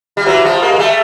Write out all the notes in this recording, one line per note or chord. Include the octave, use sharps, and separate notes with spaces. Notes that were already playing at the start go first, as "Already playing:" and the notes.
G3
E3 F#3
F3 G3
G#3 A#3
A#3
G3 A3